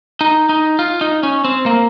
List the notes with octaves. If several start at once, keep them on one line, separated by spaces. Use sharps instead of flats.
D#4
D#4
F4
D#4
C#4
C4
A#3